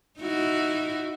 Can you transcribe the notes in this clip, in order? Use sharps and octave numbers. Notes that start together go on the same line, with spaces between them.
D#4 E4 F#4